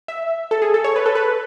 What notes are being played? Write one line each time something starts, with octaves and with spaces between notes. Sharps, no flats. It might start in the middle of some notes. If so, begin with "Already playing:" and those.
E5
A4
G#4
A4
C#5
B4
A4
B4